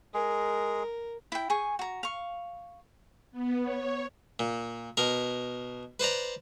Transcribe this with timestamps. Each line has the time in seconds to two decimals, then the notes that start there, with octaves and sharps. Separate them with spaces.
0.14 G#3 G#4 A#4
1.32 E4 G5
1.50 G#4 G#5 C#6
1.79 F#4 A#5
2.03 F5 C#6
3.32 B3
3.62 C#5
4.39 A#2
4.97 B2 A#4
6.00 B4 C5 D5 A#5